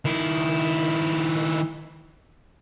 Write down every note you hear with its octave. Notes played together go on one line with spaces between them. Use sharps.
D#3 E4